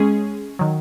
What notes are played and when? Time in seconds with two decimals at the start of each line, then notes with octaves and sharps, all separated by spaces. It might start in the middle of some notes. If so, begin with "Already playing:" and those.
Already playing: G#3 C#4 G#4
0.59 D#3 F#3